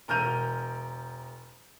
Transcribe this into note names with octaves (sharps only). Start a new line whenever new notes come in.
E1 A#4 F6 G6 D#7